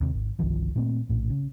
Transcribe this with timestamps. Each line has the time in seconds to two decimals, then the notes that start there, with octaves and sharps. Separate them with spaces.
0.01 D#2 C3
0.14 G#1
0.39 G1 C2 D#3 F3
0.75 A#2 A3 A#3 C4
1.09 A#1 A2
1.30 C#3